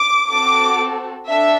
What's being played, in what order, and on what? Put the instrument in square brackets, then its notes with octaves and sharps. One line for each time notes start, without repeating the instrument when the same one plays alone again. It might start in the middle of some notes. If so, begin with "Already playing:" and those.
Already playing: [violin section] D6
C4 F#4 A4 D6
D4 A4 E5